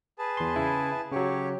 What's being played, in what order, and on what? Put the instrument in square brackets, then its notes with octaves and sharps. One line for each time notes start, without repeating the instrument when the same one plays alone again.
[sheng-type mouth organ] G#4 B4 A5
[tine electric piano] E2 C6
C#3 E4
[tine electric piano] C#3 F#3 [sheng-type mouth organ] G4 C#5